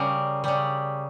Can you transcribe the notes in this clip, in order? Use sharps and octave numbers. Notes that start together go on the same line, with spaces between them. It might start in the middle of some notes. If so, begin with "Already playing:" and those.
Already playing: C#3 G3 A#4
C#3 G3